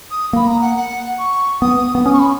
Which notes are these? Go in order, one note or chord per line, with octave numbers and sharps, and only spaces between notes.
D#6
A#3 B5
A#5
F#5
F#5
C#6
B3 D#6
B3
C#4 D#6
C#6
B5